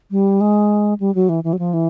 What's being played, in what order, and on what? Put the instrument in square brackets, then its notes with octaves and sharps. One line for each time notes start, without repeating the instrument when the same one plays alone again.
[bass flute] G3
G#3
G3
F#3
E3
E3
F#3
F3
E3